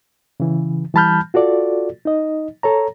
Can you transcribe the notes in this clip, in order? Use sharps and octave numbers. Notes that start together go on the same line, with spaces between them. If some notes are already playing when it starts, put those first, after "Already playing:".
C#3 E3
E3 G3 A5 B5 F6 G6
F4 F#4 A4 D5
D#4 D#5
A4 C#5 A#5